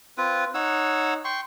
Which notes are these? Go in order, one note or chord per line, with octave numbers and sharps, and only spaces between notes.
C4 F4 B4
D#4 C#5 F#5 E6
G5 C6 C#6